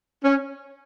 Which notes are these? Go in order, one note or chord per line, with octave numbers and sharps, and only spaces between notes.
C#4